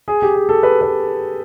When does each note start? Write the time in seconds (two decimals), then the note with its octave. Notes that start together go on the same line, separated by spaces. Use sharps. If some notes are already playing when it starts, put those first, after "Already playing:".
0.08 G#4
0.22 G4
0.35 G#4
0.49 A4
0.63 B4
0.81 B4